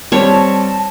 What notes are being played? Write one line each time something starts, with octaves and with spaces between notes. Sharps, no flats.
G3 C4 C5 C#5 A5